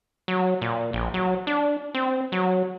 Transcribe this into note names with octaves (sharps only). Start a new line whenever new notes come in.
F#3
A#2
A#1
F#3
D4
C4
F#3